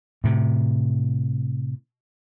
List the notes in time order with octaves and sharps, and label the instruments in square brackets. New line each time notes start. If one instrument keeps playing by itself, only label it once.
[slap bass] A2 C3